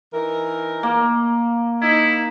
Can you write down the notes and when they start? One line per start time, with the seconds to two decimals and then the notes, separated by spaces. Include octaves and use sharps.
0.12 E3 D#4 A#4
0.83 A#3
1.82 D#4 E4